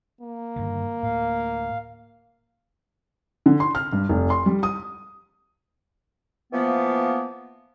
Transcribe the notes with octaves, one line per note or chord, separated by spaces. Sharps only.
A#3
G2 D3 D#3
D2 A2 F5
D3
C6
F6
G2
F1
C6
G3
D#6
E3 F3 A#3 B3